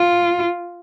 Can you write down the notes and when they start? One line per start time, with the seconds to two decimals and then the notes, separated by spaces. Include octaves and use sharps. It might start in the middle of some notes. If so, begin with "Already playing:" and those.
Already playing: F4